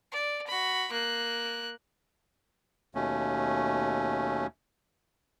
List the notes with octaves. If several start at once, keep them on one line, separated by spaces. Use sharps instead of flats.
D5
F#4 B5
A#3 F#6
D#2 B2 A3 C#4